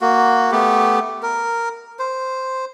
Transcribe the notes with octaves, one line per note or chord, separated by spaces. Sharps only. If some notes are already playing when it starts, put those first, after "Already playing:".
A#3 F#4
A3 B3 G4
A#4
C5